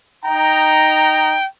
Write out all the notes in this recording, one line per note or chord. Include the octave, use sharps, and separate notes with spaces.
D#4 G5 A#5